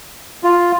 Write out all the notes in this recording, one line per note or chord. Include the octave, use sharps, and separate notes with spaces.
F4